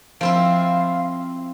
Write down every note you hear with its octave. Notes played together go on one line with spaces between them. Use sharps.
F3 C4 E4 F5